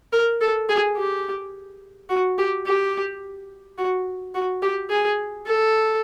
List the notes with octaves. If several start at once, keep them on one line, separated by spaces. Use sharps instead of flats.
A#4
A4
G#4
G4
F#4
G4
G4
F#4
F#4
G4
G#4
A4